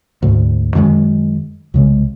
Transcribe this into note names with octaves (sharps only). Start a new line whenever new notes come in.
D2 G#2
F#2 D#3 E3 G#3
C2 C#3 G#3